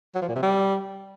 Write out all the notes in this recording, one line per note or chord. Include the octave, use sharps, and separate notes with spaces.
F#3
F3
A#2
C3
G3